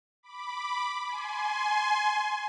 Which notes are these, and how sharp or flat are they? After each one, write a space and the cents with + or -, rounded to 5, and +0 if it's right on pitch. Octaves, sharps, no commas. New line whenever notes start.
B5 +0 D6 +0
G#5 +25 C6 +0